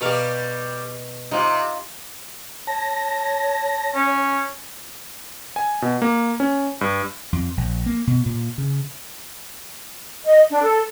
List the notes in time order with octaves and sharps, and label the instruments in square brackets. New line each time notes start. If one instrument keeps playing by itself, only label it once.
[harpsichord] B2 A#4 F5 [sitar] G3 G4
[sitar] C3 [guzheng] D#4 F4 G4
[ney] C#5 [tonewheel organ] A5 A#6
[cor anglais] C#4
[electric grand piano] G#5
B2
A#3
C#4
G2
[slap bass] F2
A#1
A#3
B2
A#2
C#3
[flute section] D#5
D4
A4